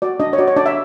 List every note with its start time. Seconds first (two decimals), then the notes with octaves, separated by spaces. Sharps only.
0.02 F#4 D5
0.20 D4 D#5
0.33 C#5
0.38 F#4 D5
0.47 C#5
0.57 D4 D5
0.66 E5